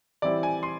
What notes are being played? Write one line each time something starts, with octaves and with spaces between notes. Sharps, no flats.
E3 G3 C4 E4 D5
G#5
C6